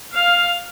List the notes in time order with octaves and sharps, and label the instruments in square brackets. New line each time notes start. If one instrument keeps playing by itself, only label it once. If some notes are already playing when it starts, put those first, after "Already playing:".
[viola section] F5